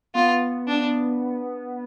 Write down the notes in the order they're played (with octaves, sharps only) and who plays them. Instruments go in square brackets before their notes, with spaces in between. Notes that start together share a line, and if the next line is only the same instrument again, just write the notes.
[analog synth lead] B3 [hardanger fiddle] F4
[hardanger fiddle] D4